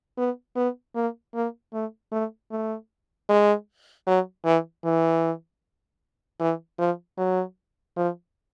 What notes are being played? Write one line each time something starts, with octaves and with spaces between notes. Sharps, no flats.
B3
B3
A#3
A#3
A3
A3
A3
G#3
F#3
E3
E3
E3
F3
F#3
F3